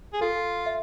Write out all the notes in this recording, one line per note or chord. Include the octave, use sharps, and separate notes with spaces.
G#4
F4 A4
E5